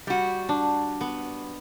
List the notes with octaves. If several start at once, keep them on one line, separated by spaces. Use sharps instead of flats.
G3 F#4
D4
B3